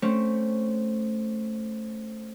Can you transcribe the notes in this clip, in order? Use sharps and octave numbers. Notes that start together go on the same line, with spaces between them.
A3 C4 C#4